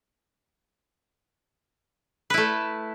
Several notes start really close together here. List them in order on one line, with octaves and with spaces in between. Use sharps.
B4 E4 A3